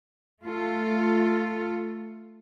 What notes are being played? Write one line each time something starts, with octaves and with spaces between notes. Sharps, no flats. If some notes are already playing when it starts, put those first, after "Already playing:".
A3 F4 A4